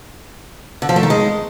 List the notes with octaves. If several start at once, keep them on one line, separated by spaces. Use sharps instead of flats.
D3
F3
A3
D#3
G#3